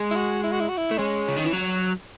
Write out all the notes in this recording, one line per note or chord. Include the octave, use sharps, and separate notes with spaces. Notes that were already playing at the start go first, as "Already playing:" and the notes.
Already playing: G#3
E4
F#4
E4
F#4
E4
F#4
E4
A3
G#3 C#4
C#3
D#3
E3
F#3